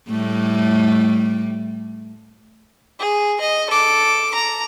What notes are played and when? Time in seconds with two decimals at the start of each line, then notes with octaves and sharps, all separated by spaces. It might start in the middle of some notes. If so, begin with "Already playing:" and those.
0.10 A2 G3 A3
2.99 G#4
3.41 D#5
3.70 A4 D6
4.34 A#5